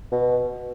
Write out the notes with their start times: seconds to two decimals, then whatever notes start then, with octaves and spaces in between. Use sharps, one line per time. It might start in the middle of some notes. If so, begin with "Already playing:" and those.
0.12 B2